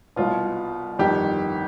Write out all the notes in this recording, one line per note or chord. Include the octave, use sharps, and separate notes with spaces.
C2 B2 F4
G1 F2 D#3 G4